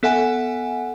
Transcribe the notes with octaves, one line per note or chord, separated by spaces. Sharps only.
B3 A4 E5 F#5 G#5